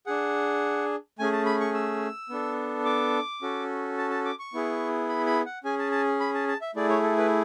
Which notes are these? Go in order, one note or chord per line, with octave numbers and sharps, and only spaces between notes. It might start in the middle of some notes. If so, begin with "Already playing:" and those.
D4 G#4 F#5
A3 C#4 G#4 G#5
A5
B5
C#6
E6
B3 D4 A4
D6
C#4 F#4 A4
A5
A5
D6
C#6
B3 E4 G#4
B5
B5
F#5
C#4 G#4 G#5
A5
A5
B5
A5
A5
E5
A3 E4 G#4 D5
C#5
A4
B4